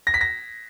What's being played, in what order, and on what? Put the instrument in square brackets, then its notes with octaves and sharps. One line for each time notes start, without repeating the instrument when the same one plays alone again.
[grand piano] A#6
B6
A#6